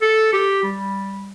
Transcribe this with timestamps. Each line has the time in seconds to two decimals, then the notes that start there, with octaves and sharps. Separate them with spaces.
0.02 A4
0.33 G4
0.63 G3